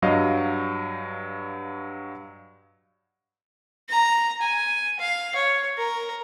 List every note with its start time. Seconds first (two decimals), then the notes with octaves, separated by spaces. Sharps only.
0.02 G2 F#3 D#5 F5
3.89 A#5
4.41 G#5
4.99 F5
5.35 C#5
5.78 A#4